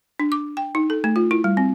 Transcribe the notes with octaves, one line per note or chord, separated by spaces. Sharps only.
D4
D6
G5
D#4
A4
A3
F4
E4
G3
C4